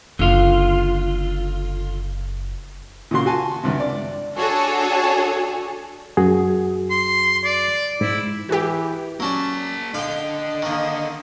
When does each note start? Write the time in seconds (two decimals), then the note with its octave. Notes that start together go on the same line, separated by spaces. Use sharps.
0.19 F#1 D3 F4
3.11 A#2 C#3 F#4 C6
3.26 F#4 G#5 A5
3.63 C#2 G2 C3
3.80 D5
4.35 D4 F#4 G#4 A4 C#5
6.17 F#2 F#4 G#4
6.91 C6
7.44 D5
8.01 G#2 E4
8.49 E3 F#4 G4
9.20 F#3 A#3 C#4 D5 A5
9.94 D3 D4 D#5 F5 G5
10.62 D#3 A#3